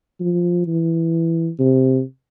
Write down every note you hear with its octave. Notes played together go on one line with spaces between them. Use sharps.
F3
E3
C3